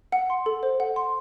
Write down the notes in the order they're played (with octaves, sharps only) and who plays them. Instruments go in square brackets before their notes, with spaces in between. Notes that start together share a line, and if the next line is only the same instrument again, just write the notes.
[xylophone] F#5
C6
A4
C5
F#5
C6